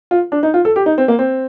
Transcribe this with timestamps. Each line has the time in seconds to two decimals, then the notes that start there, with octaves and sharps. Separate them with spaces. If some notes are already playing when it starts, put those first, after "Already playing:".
0.11 F4
0.32 D4
0.43 D#4
0.54 F4
0.65 A4
0.76 G4
0.86 D#4
0.98 C4
1.08 A#3
1.19 C4